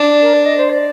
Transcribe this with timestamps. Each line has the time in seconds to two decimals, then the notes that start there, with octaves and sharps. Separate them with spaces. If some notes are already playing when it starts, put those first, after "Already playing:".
Already playing: D4
0.22 A#4
0.34 D5
0.45 D#5
0.58 C5
0.70 D5